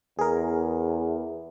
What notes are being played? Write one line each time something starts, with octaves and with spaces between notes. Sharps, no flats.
E2 G#4 A#4